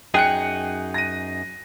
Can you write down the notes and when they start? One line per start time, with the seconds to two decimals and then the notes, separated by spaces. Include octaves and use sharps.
0.14 F#2 D#4 G#4 G5 F#6 C#7
0.94 A#6 D#7